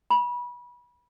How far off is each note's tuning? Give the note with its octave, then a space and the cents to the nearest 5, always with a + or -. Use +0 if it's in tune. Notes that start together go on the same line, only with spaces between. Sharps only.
B5 -25